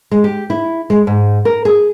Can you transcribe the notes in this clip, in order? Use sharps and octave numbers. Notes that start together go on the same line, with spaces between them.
G#3
G4
E4
G#3
G#2
A#4
G#4